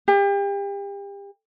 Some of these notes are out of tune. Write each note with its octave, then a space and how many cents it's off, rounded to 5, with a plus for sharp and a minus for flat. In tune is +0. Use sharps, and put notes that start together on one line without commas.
G4 +35